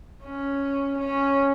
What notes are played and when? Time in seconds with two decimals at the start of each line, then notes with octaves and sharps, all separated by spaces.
0.23 C#4
0.99 C#4